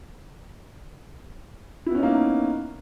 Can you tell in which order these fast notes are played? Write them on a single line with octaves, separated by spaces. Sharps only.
E4 B3 C#4 D#4 A#3